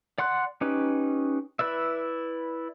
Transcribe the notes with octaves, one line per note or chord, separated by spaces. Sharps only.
D5 F#5 C6 F#6
C#4 D#4 G4 B4
E4 B4 D5 E5